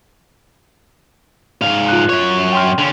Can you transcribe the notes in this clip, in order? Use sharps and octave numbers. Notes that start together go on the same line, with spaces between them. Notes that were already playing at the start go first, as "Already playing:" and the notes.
G#2 F5
F4 F#6
F#2 C#5
G5 C6 F6
D3 C#4